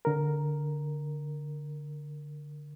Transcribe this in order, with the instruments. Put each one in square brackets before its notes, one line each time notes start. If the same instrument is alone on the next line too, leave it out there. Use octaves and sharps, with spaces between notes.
[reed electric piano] D3 A#4